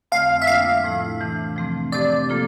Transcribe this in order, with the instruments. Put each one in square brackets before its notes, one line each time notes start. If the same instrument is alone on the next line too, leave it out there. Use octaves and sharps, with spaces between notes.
[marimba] F2 D3 A3 C4 [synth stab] F5
[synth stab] E5
[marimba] G3 A#3 D4 F4 [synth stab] F5
[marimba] A2 F3 A3 E4
C3 E3 A3 D4
F3 A3 C4
[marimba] C3 F3 A3 C4 G4 [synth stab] D5
[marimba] F3 A#3 F4 A4